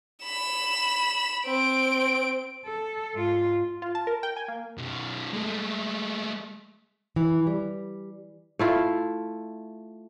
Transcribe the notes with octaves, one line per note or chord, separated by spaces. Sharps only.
B5 E7
C4 D7
A4
G#2 F4
F4
A5
A#4
G5
G#5
A#3
F#2 B2
G#3 A3
E3
G3
A3 E4 F4